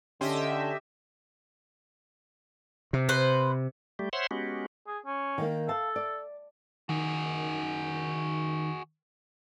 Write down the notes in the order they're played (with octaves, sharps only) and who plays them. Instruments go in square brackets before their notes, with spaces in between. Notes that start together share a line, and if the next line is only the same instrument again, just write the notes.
[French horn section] D3 [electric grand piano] C#4 G5 C6 [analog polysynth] G4 D#5 E5
[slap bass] C3
[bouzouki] B4 C5
[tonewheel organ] G3 A3 G4
C5 C#5 E5 F#5 C6
G#3 B3 C#4 F#4 G4
[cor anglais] G#4
C#4
[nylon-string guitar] D#3 A#3
[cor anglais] A4 [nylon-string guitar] F5 A5
[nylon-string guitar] D5
[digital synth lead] D#3 [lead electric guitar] F#4 G#4